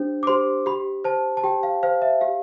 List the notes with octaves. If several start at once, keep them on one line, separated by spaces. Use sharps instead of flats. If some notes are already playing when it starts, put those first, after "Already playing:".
Already playing: D4 G4 C5
D6
G4 C5 C6
G4 B5
C5 A5
A5
G4 G5
F5
C5 F5
E5
G4 F5